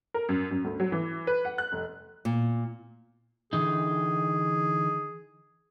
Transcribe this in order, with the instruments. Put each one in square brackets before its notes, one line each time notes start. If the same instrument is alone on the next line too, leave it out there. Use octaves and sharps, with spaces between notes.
[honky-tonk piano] A#4
F#2
F#2
D2
F#3
E3
B4
F#5
F#6
F1
[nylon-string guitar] A#2
[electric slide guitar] D3 E3 D#4 [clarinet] G#4